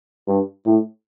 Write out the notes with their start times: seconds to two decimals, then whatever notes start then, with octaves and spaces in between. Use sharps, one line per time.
0.27 G2
0.66 A2